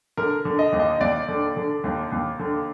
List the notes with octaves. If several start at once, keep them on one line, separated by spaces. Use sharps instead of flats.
D3 A#4
D3
D#5
D#2
D#5
D#2 D5
D3
D3
D#2
D#2
D3